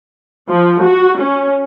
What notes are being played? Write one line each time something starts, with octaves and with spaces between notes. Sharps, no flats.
F3
F#4
C#4